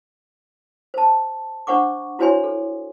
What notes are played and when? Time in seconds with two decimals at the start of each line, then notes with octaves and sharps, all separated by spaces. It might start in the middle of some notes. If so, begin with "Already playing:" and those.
0.94 C5 A5
1.67 D4 C5 F#5 C#6 D6
2.19 E4 F#4 C5 C#5 G#5 C6
2.44 A4